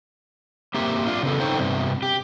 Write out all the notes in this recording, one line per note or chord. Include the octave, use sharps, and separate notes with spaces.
A#3 C4 G4 E5
D4 F4
C#3 B3 A4
C4 D#4 A4 C5 C#5 G5
G2 C3 B3
G4